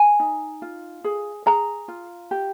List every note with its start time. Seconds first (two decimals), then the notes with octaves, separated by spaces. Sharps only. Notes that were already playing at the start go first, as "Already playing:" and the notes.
Already playing: G#5
0.20 D#4
0.62 F4
1.04 G#4
1.46 G#4 A#5
1.88 F4
2.31 G4